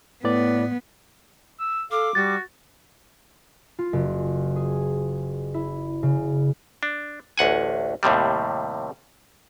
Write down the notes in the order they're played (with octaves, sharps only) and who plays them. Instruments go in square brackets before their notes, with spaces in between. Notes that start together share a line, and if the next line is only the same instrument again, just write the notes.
[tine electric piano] A2 B4 D5 [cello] B3
[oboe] E6
[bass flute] A4 [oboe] F5 [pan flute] D6
[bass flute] G3 [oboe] F#4 [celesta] A6
[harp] F4
F#1
G#4
E4
C#3
[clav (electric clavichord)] D4
A1 D2 F#5 G#5
D#2 A2 C3 G3